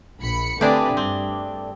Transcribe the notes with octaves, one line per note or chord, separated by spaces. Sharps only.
A#1 B5 C#7
D3 A3 C4 D4 G4 G#4 B4 D5
G2 C4